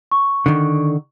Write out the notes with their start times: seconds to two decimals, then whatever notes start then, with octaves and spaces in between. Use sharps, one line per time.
0.11 C#6
0.46 D3 D#3